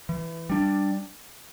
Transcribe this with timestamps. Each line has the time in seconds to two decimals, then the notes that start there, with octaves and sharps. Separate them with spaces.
0.09 E3
0.50 G3 D4